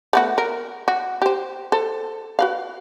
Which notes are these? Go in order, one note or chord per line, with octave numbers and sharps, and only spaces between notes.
A3 B3 F#4
A#4
F#4
G4 C5
A4 C5
F#4 B4 F5